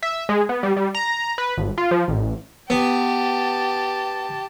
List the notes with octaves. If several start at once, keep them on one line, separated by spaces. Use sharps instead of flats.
E5
G#3
B3
G3
G3
A#5
B4
G#1
F4
F3
A1
B3 G4 A5